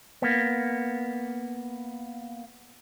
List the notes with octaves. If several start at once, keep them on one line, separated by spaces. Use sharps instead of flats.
A#3 B3